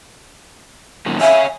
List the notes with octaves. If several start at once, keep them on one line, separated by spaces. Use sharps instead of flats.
F#2 A#2 D#3
C#5 E5 F5 G#5